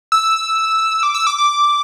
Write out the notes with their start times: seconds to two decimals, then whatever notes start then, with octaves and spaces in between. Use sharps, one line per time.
0.12 E6
1.03 D6
1.15 E6
1.27 D6
1.38 D6